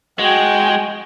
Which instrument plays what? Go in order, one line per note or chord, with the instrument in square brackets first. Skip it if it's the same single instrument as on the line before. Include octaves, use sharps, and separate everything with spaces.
[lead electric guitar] G#3 [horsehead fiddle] F#4 G5